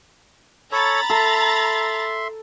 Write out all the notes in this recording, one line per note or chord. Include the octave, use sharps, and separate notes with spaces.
A4 C#5 A#5 B5 A6
A4 E5 C6